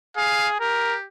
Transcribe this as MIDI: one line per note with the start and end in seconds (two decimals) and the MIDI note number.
0.17 0.58 68
0.17 0.48 77
0.60 1.06 67
0.60 0.96 70